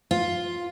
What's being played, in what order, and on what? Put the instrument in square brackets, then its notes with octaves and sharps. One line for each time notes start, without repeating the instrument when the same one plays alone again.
[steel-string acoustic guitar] F4